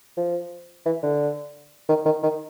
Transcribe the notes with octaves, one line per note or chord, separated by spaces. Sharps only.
F3
E3
D3
D#3
D#3
D#3